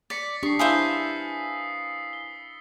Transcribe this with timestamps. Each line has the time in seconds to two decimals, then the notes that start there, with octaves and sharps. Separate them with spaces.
0.10 D5 A6 B6 C#7
0.43 D4 G4 C#6 D#6 C7
0.59 E4 B4 C5 E5 F5 G#5 D#6 E6
2.13 G7